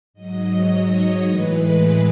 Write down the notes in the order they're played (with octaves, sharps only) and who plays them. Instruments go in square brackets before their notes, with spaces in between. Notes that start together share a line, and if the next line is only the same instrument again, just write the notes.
[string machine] G#2 F#3 D#5
C#5
A2 E3 G#3 B4
G#4